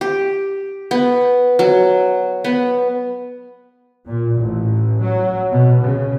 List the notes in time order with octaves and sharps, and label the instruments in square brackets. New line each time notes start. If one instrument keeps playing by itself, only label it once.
[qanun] G4
B3
F#3
B3
[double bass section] A#2
A1
F#3
B2
C#3